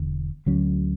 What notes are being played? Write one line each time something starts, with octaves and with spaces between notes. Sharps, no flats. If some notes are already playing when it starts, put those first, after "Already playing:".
Already playing: E1 E2 D3
D2 D3 F#3 C#4